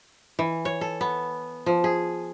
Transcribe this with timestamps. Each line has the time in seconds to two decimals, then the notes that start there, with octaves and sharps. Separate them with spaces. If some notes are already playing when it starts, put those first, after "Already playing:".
0.39 E3
0.65 C#5
0.81 A4
1.01 B3
1.66 F3
1.84 G#4